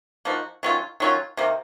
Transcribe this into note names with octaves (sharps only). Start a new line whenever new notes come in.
F3 A#3 D#4 F#4
D#3 F#3 C#4 F4
D#3 F#3 C#4 F4
C3 D#3 A#3